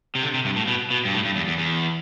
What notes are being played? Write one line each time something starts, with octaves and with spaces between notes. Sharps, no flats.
C3
D3
C3
G2
A2
B2
B2
G2
A2
G2
E2
E2
E2